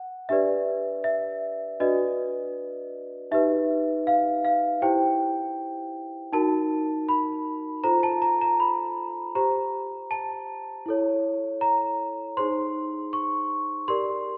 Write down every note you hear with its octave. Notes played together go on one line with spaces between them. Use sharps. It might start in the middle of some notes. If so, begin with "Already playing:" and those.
Already playing: F#5
D4 G4 B4 D5 E5
E5
D4 F#4 B4 D5 D#5
D#4 G4 B4 E5
F5
F5
E4 G4 C5 G5
D#4 F#4 A#4 A5
B5
F4 A4 C5 A#5
A5
A#5
A#5
B5
G4 C5 A#5
A5
E4 A4 C#5
A#5
D#4 G#4 C5 C6
C#6
G4 A#4 D5 C6